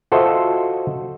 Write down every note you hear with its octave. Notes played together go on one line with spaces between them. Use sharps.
F4 F#4 A4 C5 D#5 E5